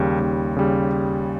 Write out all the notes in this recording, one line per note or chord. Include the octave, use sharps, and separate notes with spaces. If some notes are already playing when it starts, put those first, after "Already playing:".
Already playing: D#2 C#3 G3
D#2
C#3 G3